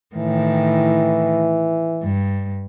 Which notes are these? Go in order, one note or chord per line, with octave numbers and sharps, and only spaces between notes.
A2 D#3 E3
G2